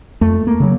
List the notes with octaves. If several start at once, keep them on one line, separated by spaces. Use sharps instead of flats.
F2 A3
A#3
C#3 F#3